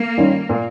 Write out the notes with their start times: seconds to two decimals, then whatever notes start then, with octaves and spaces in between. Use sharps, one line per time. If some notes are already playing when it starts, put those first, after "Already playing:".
Already playing: A#3
0.18 D#3 G3 C#4 F4
0.49 A#2